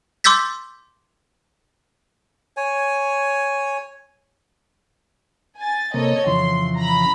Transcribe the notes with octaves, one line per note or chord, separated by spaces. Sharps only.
C6 D6 E6 G6 A6 B6
C#5 G#5
G#5 A6
C3 A#3 A4 C#5 D#5
F2 C#3 E3 C6
A#5 B5